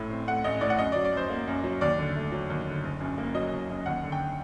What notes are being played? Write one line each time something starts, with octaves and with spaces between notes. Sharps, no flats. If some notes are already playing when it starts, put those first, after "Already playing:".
Already playing: A1 A2
C4
A3 F#5
A1 D#5
A2 D5
F#5
F#2 D#5
F#3 D5
D5
F#2 C5
A#3
F#2
F#3
D#2 D5
D3
A3
F#3
D#2
D3
F#1
F#2
A#3
F#3 D#5
F#1
F#2
D#2 F#5
D3
G5